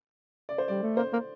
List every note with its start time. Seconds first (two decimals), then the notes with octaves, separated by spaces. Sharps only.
0.49 D5
0.58 C5
0.68 G3 D5
0.83 A3
0.97 A#3 C5
1.13 A#3